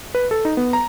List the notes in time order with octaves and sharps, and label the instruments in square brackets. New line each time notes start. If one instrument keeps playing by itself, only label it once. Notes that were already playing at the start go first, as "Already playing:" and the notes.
[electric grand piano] B4
A4
D#4
B3
A#5